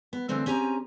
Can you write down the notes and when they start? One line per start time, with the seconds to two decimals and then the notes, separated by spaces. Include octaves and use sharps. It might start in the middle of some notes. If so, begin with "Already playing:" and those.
0.13 B3
0.28 D3 E3 A3 C4 C#4
0.46 C4 C#4 G4 G#5 A#5